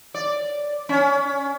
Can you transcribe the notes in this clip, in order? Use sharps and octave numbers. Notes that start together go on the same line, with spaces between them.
D5
C#4